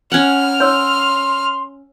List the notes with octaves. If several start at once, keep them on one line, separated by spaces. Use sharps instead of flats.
C#4 F#5 F6
C#5 C6 E6